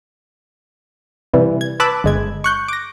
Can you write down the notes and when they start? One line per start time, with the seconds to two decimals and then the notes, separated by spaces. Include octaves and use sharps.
1.34 C3 E3 G3
1.61 G#6
1.80 B4 A5 B5 D6 E6 F#6
2.04 G1 G#3 G#6
2.44 C#6 F#6 G6
2.68 D6 A#6